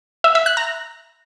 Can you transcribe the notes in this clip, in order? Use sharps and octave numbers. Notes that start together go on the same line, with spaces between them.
E5
E5
F#6
A#5